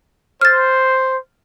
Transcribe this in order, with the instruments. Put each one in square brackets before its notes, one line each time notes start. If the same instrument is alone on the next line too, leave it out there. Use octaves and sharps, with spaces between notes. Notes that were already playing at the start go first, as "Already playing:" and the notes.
[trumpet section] C5 [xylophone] F6 A6